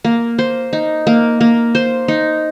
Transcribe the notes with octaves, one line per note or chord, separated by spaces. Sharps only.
A#3
C5
D#4
A#3
A#3
C5
D#4